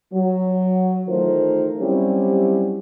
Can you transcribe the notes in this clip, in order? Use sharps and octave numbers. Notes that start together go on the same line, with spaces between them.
F#3
D#3 E3 A3 F4 A#4 C5
F#3 G3 C4 C#4 E4 G4